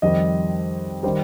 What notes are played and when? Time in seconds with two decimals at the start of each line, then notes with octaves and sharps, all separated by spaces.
0.02 F2 D#3 G3 D#5
1.03 D#3 G3 C5